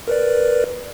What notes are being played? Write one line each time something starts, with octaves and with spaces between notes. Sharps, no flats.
A#4 B4 D5